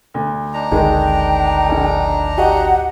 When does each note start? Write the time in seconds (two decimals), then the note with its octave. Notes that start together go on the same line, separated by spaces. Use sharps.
0.14 D2
0.54 D4 D#4 A#5
0.72 G#1 D2 D#3 G#3 G5
1.68 A#1 D3
2.38 F#4 G4 D#5 F#5